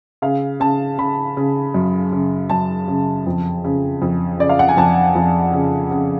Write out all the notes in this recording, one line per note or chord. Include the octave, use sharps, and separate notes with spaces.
C#3 F5
C#3 A5
C#3 B5
C#3
F#2
C#3
F#2 A5
C#3
F2
C#3
F2
C#3 D5
F5
F#5
G#5
F2 A5
F2
C#3
C#3